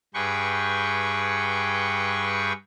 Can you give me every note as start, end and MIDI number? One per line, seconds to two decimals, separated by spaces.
0.14 2.53 43
0.14 2.53 68
0.14 2.53 71
0.14 2.53 79
0.14 2.53 85